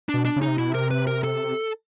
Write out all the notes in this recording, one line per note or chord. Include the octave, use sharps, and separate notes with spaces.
D4
B2
D4
C#3
D#4
C3
B2 E4
C3 A#4
B4
A#4
A4